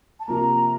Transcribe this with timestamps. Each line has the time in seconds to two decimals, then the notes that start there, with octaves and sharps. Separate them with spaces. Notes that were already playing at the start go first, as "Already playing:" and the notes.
0.20 A5
0.27 C3 F3 A#3 A#5